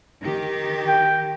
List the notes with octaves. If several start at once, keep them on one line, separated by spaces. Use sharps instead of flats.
D#3 G4
G5